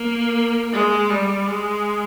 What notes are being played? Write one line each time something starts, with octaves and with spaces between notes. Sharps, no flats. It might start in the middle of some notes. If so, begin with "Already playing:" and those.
Already playing: A#3
G#3
G3
G#3